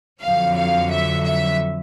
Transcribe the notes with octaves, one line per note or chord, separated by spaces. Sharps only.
F2 D3 F#3 F5
F5
E5
E5